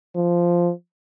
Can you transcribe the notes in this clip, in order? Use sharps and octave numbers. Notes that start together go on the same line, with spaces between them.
F3